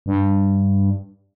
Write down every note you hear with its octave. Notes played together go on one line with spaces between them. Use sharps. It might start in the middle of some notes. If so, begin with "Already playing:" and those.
G2